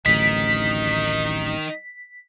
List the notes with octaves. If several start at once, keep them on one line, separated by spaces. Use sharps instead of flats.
D1 A1 D2 D#3 D#4 B6